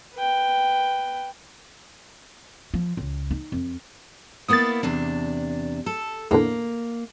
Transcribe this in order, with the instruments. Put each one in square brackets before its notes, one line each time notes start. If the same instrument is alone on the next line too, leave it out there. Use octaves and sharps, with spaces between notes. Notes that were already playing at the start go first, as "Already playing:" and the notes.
[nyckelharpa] B4 G5
[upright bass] F3
C#2
D#4
F2
[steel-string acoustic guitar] A#3 B3 E4 [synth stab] D#6 A6
[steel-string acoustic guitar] E2 C3 D4
A4
[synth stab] E2 A2 D3 [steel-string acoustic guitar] A#3